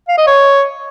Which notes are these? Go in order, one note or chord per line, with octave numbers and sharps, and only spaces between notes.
F5
D#5
C#5